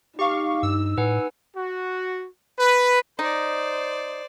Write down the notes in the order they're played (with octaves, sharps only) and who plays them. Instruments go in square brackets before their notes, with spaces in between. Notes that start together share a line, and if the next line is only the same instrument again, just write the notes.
[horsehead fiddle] D#4 [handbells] G4 [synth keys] F5 C#6
[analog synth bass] G2 [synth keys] E6
[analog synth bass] A2 [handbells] B4 F#5 G#5
[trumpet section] F#4
B4
[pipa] D#4 [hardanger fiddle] C5 D5